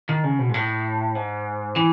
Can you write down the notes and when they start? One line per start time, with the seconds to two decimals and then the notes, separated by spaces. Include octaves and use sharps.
0.09 D#3
0.24 C#3
0.39 B2
0.49 G#2
0.54 A2
1.15 G#2
1.76 E3